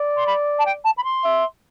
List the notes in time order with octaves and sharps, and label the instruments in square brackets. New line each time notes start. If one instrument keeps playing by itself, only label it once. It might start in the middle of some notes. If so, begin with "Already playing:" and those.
Already playing: [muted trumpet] D5
[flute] C6
B5
A5
G5
A5
B5
C6
[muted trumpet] E5